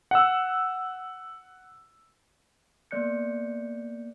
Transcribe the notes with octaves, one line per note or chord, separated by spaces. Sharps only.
F#5 E6
A#3 B3 D5 F#6 G6 C#7